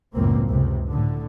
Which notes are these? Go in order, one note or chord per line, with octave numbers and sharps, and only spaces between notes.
F#1 C#2 F#2 A2 A#3 C4
C#2 C3
A2 D3